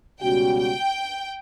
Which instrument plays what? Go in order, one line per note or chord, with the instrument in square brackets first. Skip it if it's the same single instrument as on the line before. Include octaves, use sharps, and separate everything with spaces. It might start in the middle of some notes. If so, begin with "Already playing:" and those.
[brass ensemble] C#2 B2 G3 C#4 F#4 [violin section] G5
[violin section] G5